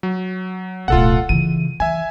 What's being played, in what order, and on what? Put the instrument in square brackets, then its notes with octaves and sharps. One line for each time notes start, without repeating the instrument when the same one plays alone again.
[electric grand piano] F#3
[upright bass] D1 B1 [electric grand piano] F4 A4 F#5
[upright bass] C#3 E3 [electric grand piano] D#7
[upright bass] E3 [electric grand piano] E5 G#5